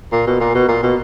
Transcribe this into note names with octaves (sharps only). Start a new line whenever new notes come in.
A#2
B2
A#2
B2
A#2
B2